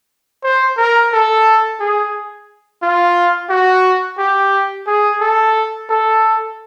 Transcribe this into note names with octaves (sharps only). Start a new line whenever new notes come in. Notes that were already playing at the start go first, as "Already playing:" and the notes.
C5
A#4
A4
G#4
F4
F#4
G4
G#4
A4
A4